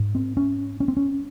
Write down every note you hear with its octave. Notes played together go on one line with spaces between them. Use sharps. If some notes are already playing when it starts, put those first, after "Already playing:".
Already playing: G#2
C4
C#4
C#4
C4
C#4